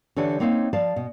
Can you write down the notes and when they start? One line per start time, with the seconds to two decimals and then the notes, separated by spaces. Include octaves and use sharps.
0.17 D3 E3 D4 G4 C#5
0.40 A#3 C4 D#4 C#5 F5
0.73 F3 D5 F5 A5
0.96 B2